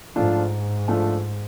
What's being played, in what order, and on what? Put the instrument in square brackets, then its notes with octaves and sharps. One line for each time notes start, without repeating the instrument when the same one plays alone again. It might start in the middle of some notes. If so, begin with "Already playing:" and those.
[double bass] G#2 [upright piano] F3 A3 D4 F4
[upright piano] F3 A3 D4 F4